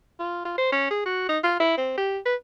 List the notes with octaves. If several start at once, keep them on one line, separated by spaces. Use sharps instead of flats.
F4
F4
C5
C#4
G#4
F#4
D#4
F4
E4
C4
G4
B4